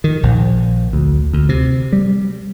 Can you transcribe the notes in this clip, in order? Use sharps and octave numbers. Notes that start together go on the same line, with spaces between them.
D#3
A#1
D2
D2
C3
G3